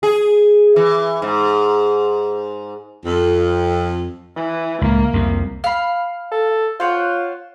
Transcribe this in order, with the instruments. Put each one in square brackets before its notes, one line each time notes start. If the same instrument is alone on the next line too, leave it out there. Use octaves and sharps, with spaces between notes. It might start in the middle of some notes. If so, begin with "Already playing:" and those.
[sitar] G#4
E3
G#2
[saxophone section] F2
[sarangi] E3
[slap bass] C#2 A2 [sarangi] A#3
[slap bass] C2 F2 C3
[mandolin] F5 B5
[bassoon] A4
[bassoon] F4 [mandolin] C5 C#5 F#5